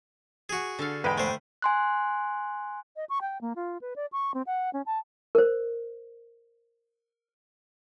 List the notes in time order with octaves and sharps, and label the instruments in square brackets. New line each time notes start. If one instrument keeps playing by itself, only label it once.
[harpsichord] F#4 G#4
[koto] D3 A4 F5
[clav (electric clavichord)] E2 G#2 G#3 [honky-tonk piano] B4 G5
[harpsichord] A3 C5
[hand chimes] G#5 C6 F#6
[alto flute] D#5
C#6
G5
A#3
F4
B4
D5
C#6
C4
F#5
C#4
A5
[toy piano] A#4 C5